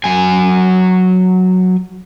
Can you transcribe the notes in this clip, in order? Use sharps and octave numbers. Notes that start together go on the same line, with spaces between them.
F#3 G#5